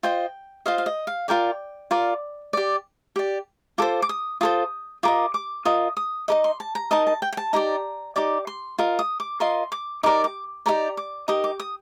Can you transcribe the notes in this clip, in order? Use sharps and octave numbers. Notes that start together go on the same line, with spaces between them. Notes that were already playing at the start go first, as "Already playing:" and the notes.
F4 C5 D#5 G5
F4 C5 D#5 F5
F5
D#5
F5
F4 A#4 D5 G5
F4 A#4 D5
G4 D5
G4 D5
F4 A4 C5 D6
D6
D#6
F4 A4 C5 D#6
F4 A#4 D#5 D6
D6
F4 A#4 D#5 D#6
D#6
D#4 A#4 D#5 D6
C6
A5
A#5
D#4 A#4 D#5 A5
A5
G5
G5
A5
D#4 G4 D5 A#5
D#4 G4 D5 D6
C6
F4 A#4 D#5
D#6
D6
F4 A#4 D#5 C6
D6
D#4 G4 A#4 D5 D6
D6
D#4 G4 A#4 D5 A#5
D6
D#4 G4 A#4 D#6
D6
D#6